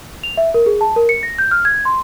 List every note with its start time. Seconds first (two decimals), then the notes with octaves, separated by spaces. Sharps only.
0.23 F7
0.37 E5
0.54 A#4
0.66 G#4
0.81 A5
0.96 A#4
1.09 C#7
1.23 A#6
1.38 G6
1.51 F6
1.65 G#6
1.85 C6